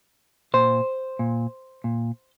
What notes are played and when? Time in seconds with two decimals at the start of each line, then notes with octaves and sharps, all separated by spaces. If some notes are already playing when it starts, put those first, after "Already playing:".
0.54 A#2 C5
1.19 A#2
1.84 A#2